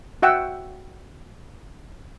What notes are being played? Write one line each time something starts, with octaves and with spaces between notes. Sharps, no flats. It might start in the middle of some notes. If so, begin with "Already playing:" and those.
F#4 E5 F#5 G5 E6